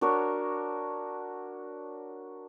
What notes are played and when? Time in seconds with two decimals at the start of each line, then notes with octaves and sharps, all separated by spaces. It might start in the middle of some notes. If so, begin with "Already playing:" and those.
0.01 D4 F#4 A#4 C#5